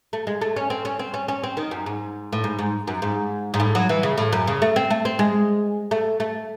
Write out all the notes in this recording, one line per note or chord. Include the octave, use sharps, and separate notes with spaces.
A3
G#3
A3
C#4
C4
C#4
C4
C#4
C#4
C4
D#3
F#2
G#2
A2
G#2
G#2
F#2
G#2
G#2
A2
F#3
E3
C#3
A2
F#2
C#3
A3
C4
A3
C4
G#3
A3
A3